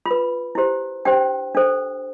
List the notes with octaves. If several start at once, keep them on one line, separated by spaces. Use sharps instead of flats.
F4 B5
B4
E4 G4 C5
D4 G4 C5 G5
D4 A4 C5